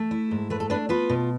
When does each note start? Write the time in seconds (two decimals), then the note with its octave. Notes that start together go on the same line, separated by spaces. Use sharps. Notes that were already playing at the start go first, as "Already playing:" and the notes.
Already playing: A3
0.11 E4
0.31 G#2
0.50 A3 B4
0.60 A4
0.70 B3 D4 B4
0.89 B3 F4 B4
1.10 B2